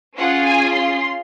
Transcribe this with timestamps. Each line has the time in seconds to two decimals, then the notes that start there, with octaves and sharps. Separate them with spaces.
0.15 C#4 F4 G#4 F#5
0.45 G#5
0.73 C6